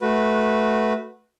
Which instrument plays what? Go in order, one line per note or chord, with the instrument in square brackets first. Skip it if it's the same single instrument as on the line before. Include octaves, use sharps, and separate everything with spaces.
[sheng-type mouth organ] A3 F#4 B4